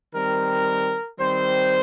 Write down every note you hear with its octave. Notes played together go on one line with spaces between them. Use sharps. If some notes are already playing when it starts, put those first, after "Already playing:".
D#3 G3 C4 A#4
D#3 G3 C4 C5